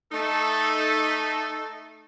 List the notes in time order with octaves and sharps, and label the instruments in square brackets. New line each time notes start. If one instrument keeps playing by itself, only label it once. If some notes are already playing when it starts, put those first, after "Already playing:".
[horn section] A3 D#4 A4